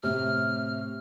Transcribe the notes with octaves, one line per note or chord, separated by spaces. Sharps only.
A2 C3 F6